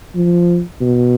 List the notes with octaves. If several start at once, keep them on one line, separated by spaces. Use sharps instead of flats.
F3
B2